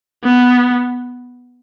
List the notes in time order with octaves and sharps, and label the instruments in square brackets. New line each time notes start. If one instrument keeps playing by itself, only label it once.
[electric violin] B3